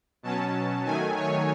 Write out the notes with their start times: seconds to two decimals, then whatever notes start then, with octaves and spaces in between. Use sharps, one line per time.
0.23 B2 F#3 C#4 A5
0.85 D#3 F#3 A3 G#5
1.16 C#5